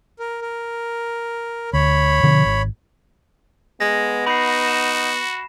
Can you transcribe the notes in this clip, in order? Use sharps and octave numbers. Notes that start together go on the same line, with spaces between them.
A#4
A#4
D2 C#5 B5
B2 D3 F3
G#1
G#3 B3 A#6
D#4 F#4 B5 C7
E7